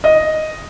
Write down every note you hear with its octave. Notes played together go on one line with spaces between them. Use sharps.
D#5